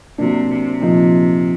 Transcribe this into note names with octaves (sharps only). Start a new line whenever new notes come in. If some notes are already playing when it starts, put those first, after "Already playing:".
C3 F#3 A#3 D4
C3
A#2 F3 A#3 D#4